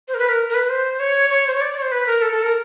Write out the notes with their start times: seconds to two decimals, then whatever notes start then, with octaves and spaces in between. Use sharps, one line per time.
0.08 C5
0.14 A#4
0.19 B4
0.29 A#4
0.50 A#4
0.54 B4
0.70 C5
1.00 C#5
1.30 C#5
1.47 C5
1.54 C#5
1.61 D5
1.72 D5
1.77 C#5
1.82 C5
1.92 B4
2.07 A#4
2.22 A4
2.32 A4
2.42 A#4